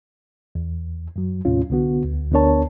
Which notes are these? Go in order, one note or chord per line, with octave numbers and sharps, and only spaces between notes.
E2
F#2 F#3
D#2 A2 C3 C#4 F4
C2 D3 B3 F#4
D2
D2 B3 D4 A#4 C#5 A5